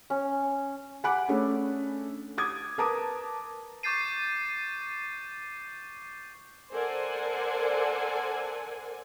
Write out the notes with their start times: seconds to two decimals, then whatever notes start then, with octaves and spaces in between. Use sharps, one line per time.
0.10 C#4
1.04 F#5 G#5 B5 D6 F#6
1.28 A3 C#4 D4 G#4
2.38 D6 D#6 G#6
2.78 A#4 B4 A5 A#5 D6 D#6
3.83 C#6 D6 G6 A6 C7 D#7
6.74 A4 A#4 C5 D5 F#5 G#5